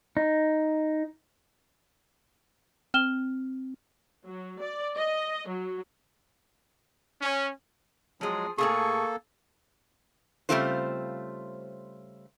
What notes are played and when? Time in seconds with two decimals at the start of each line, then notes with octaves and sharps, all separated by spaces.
0.17 D#4
2.94 C4 F6 E7 G7
4.25 F#3
4.60 D5
4.97 D#5
5.49 F#3
7.22 C#4
8.21 F3 F#3 G#3 G#4
8.58 A2 C#3 A#3 G#4 A4 C#6
10.49 C#3 G3 A3 C4 F4 C5